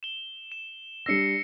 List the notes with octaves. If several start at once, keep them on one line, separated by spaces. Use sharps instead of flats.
E7 G7
E7
G3 D4 E6 A#6 C7 C#7